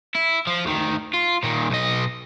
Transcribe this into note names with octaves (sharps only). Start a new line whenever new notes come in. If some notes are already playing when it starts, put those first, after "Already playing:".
E4
F3
D2 D#3
F4
A#2 D#3
B1 D#5